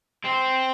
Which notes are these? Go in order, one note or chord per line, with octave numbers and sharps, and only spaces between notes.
C4